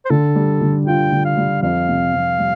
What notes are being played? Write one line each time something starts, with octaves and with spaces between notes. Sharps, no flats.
C5
D3 A4
G3
D3
F4 G5
D3
F5
G3
F2 F5
C3
F2
G3